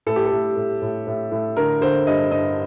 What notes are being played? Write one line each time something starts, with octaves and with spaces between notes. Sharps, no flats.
A2 A4
G4
A4
A2
A2
A2
A2
A2
D3 A#4
D3 C5
G2 D#5
G2 D#5